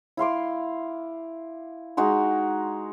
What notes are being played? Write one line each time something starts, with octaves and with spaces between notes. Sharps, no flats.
E4 F5 C6 D6
G#3 D#4 F#4 C6